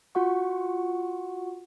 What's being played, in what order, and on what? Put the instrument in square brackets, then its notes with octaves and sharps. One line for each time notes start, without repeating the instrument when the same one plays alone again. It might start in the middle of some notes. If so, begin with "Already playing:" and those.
[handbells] F4 F#4 F#5 C#6